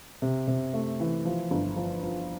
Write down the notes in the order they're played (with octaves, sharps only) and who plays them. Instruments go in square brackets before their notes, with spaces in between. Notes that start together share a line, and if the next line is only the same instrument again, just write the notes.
[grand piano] C3
C3
A3
E3
F3
G1
F3
F3